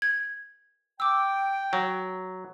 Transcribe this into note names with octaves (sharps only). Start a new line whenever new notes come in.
G#6
G5 D6 E6
F#3